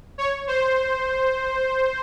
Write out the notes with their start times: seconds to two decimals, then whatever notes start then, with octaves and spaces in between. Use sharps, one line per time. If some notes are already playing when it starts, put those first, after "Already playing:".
0.18 C#5
0.47 C5